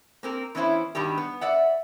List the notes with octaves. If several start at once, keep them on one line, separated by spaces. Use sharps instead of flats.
A#3 C4 A#4
E3 B3 C#4 E4 C5
G2 B2 D#3 G3 G4
B3
D5 E5 F#5